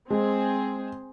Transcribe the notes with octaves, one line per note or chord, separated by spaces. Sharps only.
G#3 C4 G#4